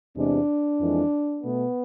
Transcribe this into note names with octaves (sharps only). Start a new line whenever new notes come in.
E2 C3 G#3 D4
F2 E3 G#3
B2 A3 B3